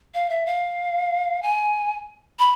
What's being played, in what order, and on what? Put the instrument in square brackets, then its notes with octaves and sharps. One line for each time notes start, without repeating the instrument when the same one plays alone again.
[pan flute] F5
E5
F5
G#5
B5